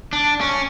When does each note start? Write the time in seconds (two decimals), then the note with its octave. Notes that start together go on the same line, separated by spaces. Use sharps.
0.13 D4
0.41 C#4